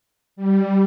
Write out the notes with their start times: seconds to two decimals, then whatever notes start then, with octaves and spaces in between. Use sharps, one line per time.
0.36 G3